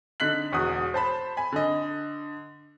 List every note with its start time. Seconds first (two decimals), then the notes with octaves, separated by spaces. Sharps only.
0.20 D3 D#4 F#6 B6 F#7
0.52 E1 E2 F#4 D#6
0.94 C5 A5 B5
1.37 G#5 B5
1.53 D3 D#5